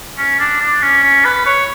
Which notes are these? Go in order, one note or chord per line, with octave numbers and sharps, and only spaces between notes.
C#4
D4
D4
C#4
C#4
B4
C#5